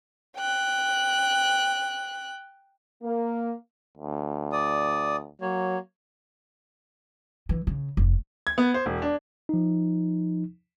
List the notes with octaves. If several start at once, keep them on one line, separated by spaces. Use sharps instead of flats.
G5 F#6
A#3
D2
D5 D#6
F#3 A#3 C#5
E3
C#3
F1
G#6
B3
C5
E1
D4
F3 D#4